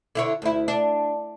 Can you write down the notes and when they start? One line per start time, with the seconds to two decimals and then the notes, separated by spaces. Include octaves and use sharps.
0.15 D3 E4 C#5
0.42 D2 E4
0.68 D4